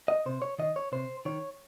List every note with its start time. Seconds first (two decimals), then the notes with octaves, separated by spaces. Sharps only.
0.08 D#5
0.26 C3 C5
0.42 C#5
0.59 D#3 D#5
0.76 C#5
0.92 C3 C5
1.25 D#3 C#5